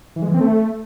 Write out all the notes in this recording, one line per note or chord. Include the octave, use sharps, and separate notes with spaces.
E3
G#3
E3
C4
A3